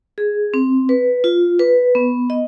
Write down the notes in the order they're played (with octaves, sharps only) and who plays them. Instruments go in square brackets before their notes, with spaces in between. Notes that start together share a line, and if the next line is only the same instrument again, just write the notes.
[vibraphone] G#4
C4
B4
F4
B4
B3
D#5